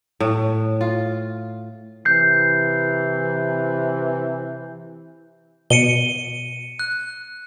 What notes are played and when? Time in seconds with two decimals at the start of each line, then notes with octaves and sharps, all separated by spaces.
0.20 A2
0.81 F4
2.05 C3 E3 G6 C7
5.70 B2 C#7 D#7 G7
6.79 F#6